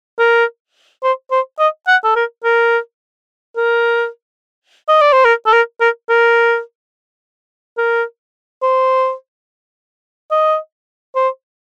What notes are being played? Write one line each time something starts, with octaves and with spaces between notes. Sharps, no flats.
A#4
C5
C5
D#5
F#5
A4
A#4
A#4
A#4
D#5
D5
C5
A#4
A4
A#4
A#4
A#4
A#4
C5
D#5
C5